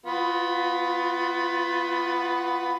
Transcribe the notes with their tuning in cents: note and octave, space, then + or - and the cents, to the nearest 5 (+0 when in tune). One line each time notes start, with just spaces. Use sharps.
F3 -30 B3 +15 F4 +35